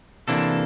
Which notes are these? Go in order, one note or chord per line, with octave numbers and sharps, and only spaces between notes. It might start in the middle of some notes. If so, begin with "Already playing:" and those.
C3 E3 A#3 D4 A4